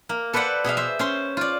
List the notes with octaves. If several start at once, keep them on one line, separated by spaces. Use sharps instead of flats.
A#3
A4 B4 C5 D5 F#5
B2 G#4 E5 F5
C5 E5
C#4 C5 C6
F4 D5